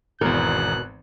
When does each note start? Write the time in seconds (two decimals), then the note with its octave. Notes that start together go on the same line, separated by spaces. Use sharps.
0.21 G#1 E2 B2 A#4 F#6